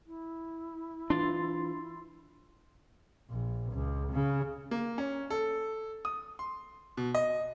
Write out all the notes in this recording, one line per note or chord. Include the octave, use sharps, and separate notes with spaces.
E4
E3 D4 F4 C6 A6
A#1
C#2
C#3
A#3
C#4
A4
D#6
C6
B2
D#5